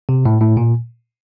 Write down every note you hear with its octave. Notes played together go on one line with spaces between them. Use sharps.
C3
A2
A2
A#2